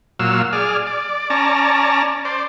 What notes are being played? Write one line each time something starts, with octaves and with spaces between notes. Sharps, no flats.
A#2 F#3 F5 E6
G#4 D5 F6
D5
C#4 D5 A5 A#5
C5 D5